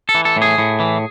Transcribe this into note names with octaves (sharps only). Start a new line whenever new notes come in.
A4
E3
A4
A2
G#4
A2
E3